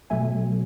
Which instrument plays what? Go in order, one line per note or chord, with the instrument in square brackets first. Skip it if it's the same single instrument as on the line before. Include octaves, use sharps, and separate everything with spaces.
[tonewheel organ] B2 F#3 A3 E5 G#5